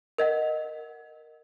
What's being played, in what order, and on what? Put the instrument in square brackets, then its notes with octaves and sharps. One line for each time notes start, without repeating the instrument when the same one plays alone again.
[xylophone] A#4 D#5 F#5